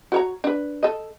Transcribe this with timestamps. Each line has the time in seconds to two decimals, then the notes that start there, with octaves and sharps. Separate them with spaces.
0.12 F#4 C#5 A#5
0.44 D4 B4
0.83 A4 D#5